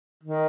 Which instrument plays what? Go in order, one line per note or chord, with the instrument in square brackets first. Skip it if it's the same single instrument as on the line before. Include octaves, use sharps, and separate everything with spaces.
[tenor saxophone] D#3